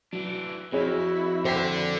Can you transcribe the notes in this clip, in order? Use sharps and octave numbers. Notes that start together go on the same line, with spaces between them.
E3 F#3 D4
F2 C4 E4 F#4 G#4 C#5
A4 C5 D5 G5 B6